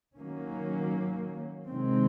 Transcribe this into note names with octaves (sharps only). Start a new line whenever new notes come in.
D#3 F#3 A#3 C#4
C3 D#3 G#3 C4